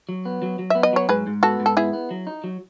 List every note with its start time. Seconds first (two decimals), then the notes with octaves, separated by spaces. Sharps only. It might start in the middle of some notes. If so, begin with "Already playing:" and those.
0.09 F#3
0.25 B3
0.43 F#3
0.59 F#3
0.70 B3 E5
0.83 D#5
0.93 F#3 C#5
1.09 G#2 G#4 B4
1.27 G#2
1.43 B3 F#4 A4
1.60 G#2
1.66 A4
1.77 B3 E4 G#4
1.93 B3
2.11 F#3
2.27 D#4
2.44 F#3